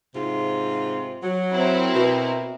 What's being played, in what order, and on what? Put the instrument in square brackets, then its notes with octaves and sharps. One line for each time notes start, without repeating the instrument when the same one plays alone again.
[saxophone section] G#2 C3 F4
F#3
[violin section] C4 E4 A#4
[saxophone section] B2